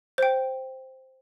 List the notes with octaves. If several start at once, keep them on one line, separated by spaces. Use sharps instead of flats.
C5 G5